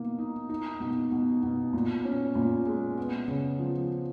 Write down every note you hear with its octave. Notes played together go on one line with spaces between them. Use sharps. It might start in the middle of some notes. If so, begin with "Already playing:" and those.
Already playing: B2 A#3 D#4
D#4
D#4
B2
B2
B2
A#2
C#4
A#2
G#3
B3
C#3
F3